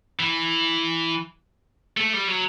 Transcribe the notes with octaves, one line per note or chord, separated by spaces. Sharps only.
E3
A3
G3
F#3